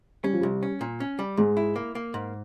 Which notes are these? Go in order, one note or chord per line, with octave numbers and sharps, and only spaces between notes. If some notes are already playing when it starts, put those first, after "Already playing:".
G3 C#4
F3
C2 G3
C#4
A#2
C#4
G3
G#2 G#3
E4
A#3
A#3
G#2